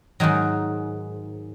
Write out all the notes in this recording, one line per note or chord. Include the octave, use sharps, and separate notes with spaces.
G#2 D#3 F#3